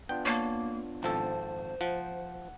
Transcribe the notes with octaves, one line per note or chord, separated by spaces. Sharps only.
B3 D4 F4 G5
A#3 C#5 A5
G#1 F3 A4 C5
F3 F#5